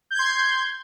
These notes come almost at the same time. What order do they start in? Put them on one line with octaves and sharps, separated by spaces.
G6 G#6 C6